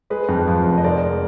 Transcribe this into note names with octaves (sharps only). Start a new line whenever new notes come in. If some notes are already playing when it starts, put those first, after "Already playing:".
G#3 G#4 B4
F2
F3
F1
D#5
G#3 A#4 D5